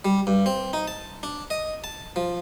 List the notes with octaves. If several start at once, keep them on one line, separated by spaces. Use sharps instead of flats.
G3
G2
C4
D#4
A5
D4
D#5
A5
F3